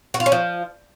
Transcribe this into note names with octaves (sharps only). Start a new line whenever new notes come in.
F#4
F4
C#4
F3